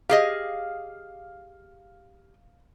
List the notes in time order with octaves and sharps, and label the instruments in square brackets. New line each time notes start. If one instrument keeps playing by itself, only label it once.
[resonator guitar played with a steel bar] G4 G#4 D#5 [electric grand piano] F5